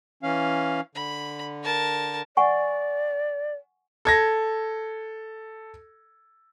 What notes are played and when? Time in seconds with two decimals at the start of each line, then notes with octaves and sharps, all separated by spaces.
0.23 E3 C#4 F5
0.95 D3 B5
1.63 A#4 A5
2.37 D5 F#5 G#5 C#6
4.05 A4 G#6 A#6